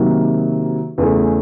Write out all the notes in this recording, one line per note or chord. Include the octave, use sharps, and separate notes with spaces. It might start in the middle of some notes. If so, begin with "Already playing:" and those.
Already playing: C3 D#3 F#3 A#3 D#4
E2 C#3 E3 A3